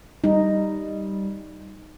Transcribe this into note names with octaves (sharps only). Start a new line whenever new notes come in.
G3 D#4